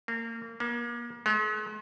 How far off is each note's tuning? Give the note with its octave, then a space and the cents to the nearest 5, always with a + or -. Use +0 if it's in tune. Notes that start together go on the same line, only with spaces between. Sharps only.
A#3 -30
A#3 +35
G#3 +45